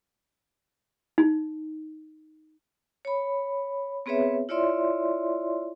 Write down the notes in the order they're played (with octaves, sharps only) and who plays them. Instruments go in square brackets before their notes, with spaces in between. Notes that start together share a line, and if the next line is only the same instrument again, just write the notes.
[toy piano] D#4
[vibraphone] C#5 B5
B3 C4 G#4 B4 C#5 E5
E4 F4 C#5 D5 E5 C6